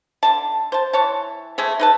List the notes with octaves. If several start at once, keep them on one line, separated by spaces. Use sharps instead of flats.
D3 A5
C5 A5
E3 C#5 A5
G#3 A3 G#4 E5
D#4 B4 A5